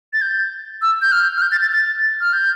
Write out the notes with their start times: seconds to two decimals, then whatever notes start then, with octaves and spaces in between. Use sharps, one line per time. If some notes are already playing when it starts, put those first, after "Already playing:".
0.13 A6
0.22 G6
0.82 E6
1.02 G6
1.12 F6
1.37 F6
1.42 G6
1.52 A6
1.62 A6
1.72 A6
2.21 F6
2.33 G6